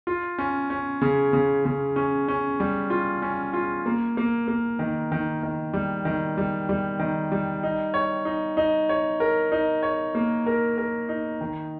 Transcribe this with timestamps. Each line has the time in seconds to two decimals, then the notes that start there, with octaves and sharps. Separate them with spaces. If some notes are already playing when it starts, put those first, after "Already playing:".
0.07 F4
0.38 C#4
0.70 C#4
1.02 C#3
1.33 C#3
1.65 C#3
1.96 C#4
2.28 C#4
2.60 G3
2.90 F4
3.22 C#4
3.53 F4
3.86 A#3
4.17 A#3
4.48 A#3
4.79 D#3
5.12 D#3
5.43 D#3
5.73 G3
6.05 D#3
6.38 G3
6.69 G3
6.99 D#3
7.32 G3
7.63 D#4
7.94 C#5
8.25 D#4
8.57 D#4
8.89 C#5
9.20 A#4
9.52 D#4
9.83 C#5
10.15 A#3
10.46 A#4
10.78 A#4
11.09 D#4
11.41 D#3